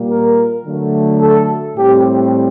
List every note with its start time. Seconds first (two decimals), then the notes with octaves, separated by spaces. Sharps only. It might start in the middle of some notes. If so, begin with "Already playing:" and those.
Already playing: A#2 G3 A#3
0.10 A#4
0.66 D3 F#3 A3
1.22 A4
1.77 A2 G3 C4 G4